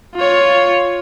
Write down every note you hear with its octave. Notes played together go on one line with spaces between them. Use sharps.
F4 C#5